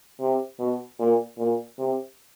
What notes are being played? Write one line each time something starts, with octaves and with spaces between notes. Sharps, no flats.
C3
B2
A#2
A#2
C3